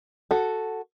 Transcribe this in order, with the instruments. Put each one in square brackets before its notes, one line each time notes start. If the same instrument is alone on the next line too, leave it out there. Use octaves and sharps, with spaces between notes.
[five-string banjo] F#4 A4